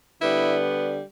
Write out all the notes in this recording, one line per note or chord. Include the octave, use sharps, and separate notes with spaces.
D3 G3 B3 E4